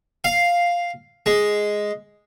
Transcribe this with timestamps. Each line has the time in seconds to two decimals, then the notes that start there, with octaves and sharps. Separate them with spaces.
0.24 F5
1.26 G#3